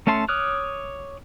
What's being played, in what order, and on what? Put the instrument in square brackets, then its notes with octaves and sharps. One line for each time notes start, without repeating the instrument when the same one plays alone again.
[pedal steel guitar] A3 C#4 E5 A5 C6
C#5 D6 D#6 F6 F#6